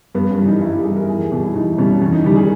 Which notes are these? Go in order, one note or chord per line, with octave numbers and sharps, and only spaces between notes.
G2 B3
C#4
E3 G3
D#4
G2 E4
G4
E3 G3 G#4
A#4
E2 G#4
G4
B2 G3 G4
E4
E2 D#4
B2 G3 C#4
E2 C#4
D#4
D#3 G3 G4
G#4